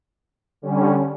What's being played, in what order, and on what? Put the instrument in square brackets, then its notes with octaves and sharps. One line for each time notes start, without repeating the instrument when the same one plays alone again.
[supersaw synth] D3 G3 C#4